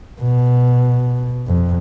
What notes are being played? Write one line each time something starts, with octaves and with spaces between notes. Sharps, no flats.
B2
F2